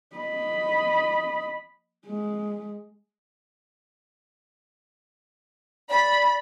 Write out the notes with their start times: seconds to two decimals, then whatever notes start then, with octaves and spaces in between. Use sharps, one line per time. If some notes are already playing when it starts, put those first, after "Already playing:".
0.16 D#5 B5
2.07 G#3
5.89 D5 B5